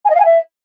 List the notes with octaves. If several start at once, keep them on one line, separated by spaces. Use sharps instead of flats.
G#5
D#5
F5
G#5
E5